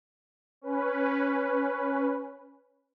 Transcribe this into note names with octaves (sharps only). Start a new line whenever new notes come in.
C#4 B4